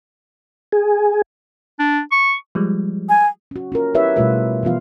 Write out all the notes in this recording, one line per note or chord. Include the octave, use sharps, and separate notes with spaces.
G#4
D4
C#6
F3 G3 G#3
G#5
C#4 F#4
C#4 F4 A#4
E4 G4 B4 C#5 E5
B2 G3 A3 F4 B4 E5
E3 F3 B3 F4 F5